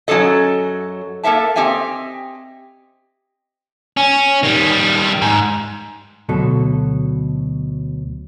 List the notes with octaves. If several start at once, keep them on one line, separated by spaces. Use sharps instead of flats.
F#2 F#3 C#4 G#4 A4 D#5
A#3 A4 A#4 E5 A5
C4 G4 D#5 E5 G#5
C#4
D#3 G3
G#2
D2 B2 F#3 A4